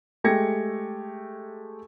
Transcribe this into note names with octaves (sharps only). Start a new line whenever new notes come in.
G#3 A3 G4 G#6 A#6 C#7